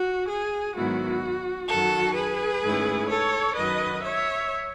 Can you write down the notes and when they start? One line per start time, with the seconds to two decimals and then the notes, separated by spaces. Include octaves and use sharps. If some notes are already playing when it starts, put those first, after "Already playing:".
Already playing: F#4
0.28 G#4
0.75 G#2 D#3 F#3 B3 E4 F#4
1.68 F#2 D#3 F#3 F#4 A4
2.15 G#4 B4
2.62 G#2 D#3 A3 C#4 E4
3.09 A4 C#5
3.55 F#2 D#3 F#3 B4 D#5
4.03 C#5 E5